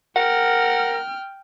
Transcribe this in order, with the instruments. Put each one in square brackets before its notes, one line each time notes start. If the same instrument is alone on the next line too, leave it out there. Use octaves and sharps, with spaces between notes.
[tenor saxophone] A#4 [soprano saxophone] F#5 [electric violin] G5 F6